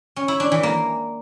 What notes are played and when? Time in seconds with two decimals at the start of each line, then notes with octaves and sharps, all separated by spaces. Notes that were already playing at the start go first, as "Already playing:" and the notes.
0.16 C#4
0.28 E4
0.40 D4
0.52 E3
0.63 A#3